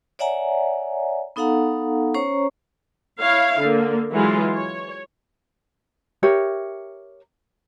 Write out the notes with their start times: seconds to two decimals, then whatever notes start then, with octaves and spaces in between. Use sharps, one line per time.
0.19 C#5 D5 E5 F#5 G#5 A#5
1.36 B3 D#4 A4 F5 F#5 A#5
2.15 C#4 C5 C#5 A#5 C#6
3.20 E4 C#5 F5
3.60 D3 A#3
4.12 E3 F#3 G#3 F4
4.52 C#5
6.23 G4 A#4 C#5 E5